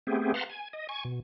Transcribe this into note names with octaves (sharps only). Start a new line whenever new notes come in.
A3 B3 C4 G4 G#4
B4 F5 F#5 A5 A#5 C6
G#5
D#5
G#5 C#6
B2